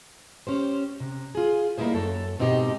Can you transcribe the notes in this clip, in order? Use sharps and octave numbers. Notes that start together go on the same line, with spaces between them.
C#4 G4 C5
C3
F4 G#4
G3 A#3 D#4 E4 G#4 C5
F#2 A4 C#5
G#2 B2 C4 D#4 G4